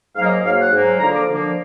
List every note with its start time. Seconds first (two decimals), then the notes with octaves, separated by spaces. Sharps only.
0.16 G#2 F#3 A#3 F5
0.25 D#5
0.44 G#2 F#3 A#3 F5
0.58 F#5
0.72 G#2 F#3 A#3
1.00 D3 F3 A#3 A#5
1.15 D6
1.29 D3 F3 A#3